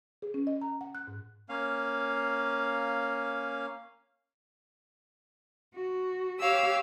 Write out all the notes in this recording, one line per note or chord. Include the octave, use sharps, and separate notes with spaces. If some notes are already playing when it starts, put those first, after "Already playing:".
G#4
C#4
D#5
A#5
F#5
F#6
G#2
A#3 C#4 F5
F#4
G4 C#5 F5 E6